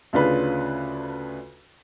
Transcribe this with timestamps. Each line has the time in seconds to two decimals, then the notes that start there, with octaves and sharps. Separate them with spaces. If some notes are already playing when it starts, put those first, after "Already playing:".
0.13 D2 C#3 D4 F4 B4